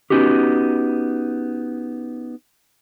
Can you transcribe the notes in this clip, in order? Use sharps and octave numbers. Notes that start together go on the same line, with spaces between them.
B3 C#4 D#4 F#4 G4